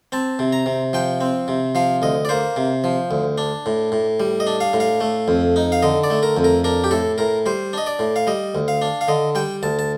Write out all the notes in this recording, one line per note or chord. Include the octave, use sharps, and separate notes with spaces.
C4 A5
C3
A#5
C3
F3 G5
C4
C3
F3 F5
D2 D#5
D5
A#3 C5
C3
F3
D2
D4
A2
A2
G3
D#5
D4
F5
A2
F5
A3
F2
D#4
F5
D3 D#5
D5
A3
A#4
F2
A#4
D4 A#4
G4
A2 A4
A2 A#4
G3 C5
D4 D#5
D5
A2
F5
G3 D#5
D2
F5
D4
F5
D3 D#5
G3 G5
D2 A5
A5